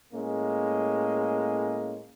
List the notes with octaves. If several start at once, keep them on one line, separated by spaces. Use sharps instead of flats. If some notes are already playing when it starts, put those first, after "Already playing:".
A2 G#3 A#3 C#4